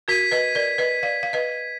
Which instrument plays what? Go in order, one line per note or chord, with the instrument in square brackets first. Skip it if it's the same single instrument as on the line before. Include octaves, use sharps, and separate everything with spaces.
[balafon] F#4 A#4 [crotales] G#6 B6 D#7
[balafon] B4 D#5
A#4 D5
B4 D#5
D5 F5
F5
B4 D#5